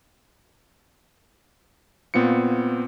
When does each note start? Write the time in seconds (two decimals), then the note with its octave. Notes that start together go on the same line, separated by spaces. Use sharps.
2.14 A#2 B3 C4 F4 C#7